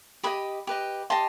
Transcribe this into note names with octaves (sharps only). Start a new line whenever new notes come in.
G4 B4 D#5 B5 D#6
G4 B4 D#5
G4 D#5 A5 C6